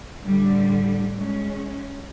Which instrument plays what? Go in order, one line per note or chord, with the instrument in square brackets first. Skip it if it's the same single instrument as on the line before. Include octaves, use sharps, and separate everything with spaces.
[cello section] A2 D3 G3
G#3 C#4